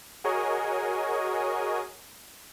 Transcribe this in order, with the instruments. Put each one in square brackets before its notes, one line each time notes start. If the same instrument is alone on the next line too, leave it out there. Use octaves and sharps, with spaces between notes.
[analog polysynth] F#4 G#4 A#4 C#5 D#5 G#5